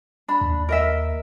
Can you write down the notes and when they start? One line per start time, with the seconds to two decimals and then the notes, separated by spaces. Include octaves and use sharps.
0.28 D4 B5
0.41 D#2
0.69 A#4 D#5 E5